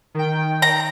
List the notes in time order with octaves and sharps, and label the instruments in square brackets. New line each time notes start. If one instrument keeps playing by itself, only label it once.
[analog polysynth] D#3 G5
[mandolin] A#5